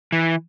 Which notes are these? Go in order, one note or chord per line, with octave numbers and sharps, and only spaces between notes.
E3